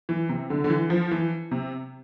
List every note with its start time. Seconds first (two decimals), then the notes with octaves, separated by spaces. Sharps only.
0.09 E3
0.29 C3
0.50 D3
0.64 D3
0.70 E3
0.90 F3
1.11 E3
1.51 C3